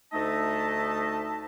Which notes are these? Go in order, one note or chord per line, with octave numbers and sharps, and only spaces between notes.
D2 A3 D#4 D#5 E5 A5